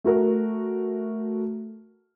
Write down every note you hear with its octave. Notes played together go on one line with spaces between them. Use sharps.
A3 F#4 A#4